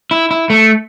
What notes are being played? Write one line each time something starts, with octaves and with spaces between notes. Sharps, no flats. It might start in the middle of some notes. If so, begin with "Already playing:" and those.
E4
E4
A3